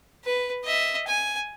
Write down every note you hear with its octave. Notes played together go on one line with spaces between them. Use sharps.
B4
D#5 E5
G#5